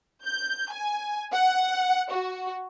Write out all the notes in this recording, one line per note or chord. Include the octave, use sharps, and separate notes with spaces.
G6
G#5
F#5
F#4